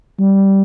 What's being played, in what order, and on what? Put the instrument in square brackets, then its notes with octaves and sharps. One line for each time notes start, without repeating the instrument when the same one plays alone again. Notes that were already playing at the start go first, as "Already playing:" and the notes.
[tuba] G3